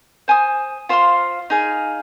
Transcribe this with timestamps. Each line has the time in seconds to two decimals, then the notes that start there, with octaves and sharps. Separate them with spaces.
0.28 C5 G#5 D#6
0.89 F4 C5 F5 C6
1.50 D#4 G#4 F5